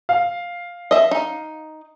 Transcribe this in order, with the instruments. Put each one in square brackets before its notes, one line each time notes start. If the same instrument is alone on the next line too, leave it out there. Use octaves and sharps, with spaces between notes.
[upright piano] F5
[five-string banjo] D#5 E5
D#4